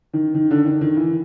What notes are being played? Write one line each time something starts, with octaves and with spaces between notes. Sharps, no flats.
D#3
D#3
D3
D#3
D#3
E3